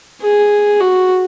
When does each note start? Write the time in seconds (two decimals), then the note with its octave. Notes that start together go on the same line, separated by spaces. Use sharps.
0.22 G#4
0.80 F#4